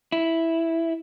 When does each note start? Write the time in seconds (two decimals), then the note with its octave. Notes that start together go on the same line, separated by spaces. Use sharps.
0.12 E4